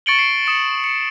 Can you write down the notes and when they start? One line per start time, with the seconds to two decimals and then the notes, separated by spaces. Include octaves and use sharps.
0.06 C#6 A6 C#7 D7 F#7 G7
0.19 C7
0.47 D#6 C#7 E7
0.84 C#7